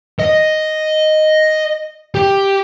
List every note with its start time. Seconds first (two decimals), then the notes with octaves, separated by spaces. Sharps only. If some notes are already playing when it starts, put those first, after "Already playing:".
0.19 D#5
2.15 G4